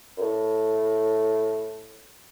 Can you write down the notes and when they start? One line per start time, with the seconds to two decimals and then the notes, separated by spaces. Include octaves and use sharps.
0.17 F#2
0.22 A2